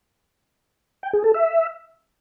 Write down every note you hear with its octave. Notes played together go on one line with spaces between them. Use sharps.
G5
G#4
A4
E5